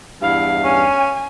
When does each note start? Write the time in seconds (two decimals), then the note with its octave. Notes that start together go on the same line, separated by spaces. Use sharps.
0.22 E2 G2 E4 F5
0.64 C#4 G#5